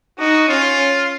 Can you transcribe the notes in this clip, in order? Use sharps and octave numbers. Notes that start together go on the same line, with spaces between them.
D#4 F#4
C#4 F4